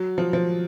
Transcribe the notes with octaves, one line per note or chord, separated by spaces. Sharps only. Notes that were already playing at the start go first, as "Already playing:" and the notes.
Already playing: F#3
F3
F3